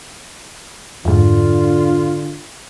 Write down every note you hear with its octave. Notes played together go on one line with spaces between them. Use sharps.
F2 G#2 D3 F4